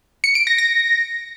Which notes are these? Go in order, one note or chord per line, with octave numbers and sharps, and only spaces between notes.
C#7
D7
A#6
A#6